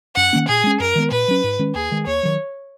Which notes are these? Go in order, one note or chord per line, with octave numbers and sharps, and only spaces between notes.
F#2 F#5
D#3 A#3 C#4
A#2 G#4
G#3 C#4
F#2 A#4
D#3 G#3 B3
A#2 B4
F#3 C#4
G#2
D#3 G#3 C#4
D#2 G#4
D#3 G#3
D#2 C#5
D#3 F#3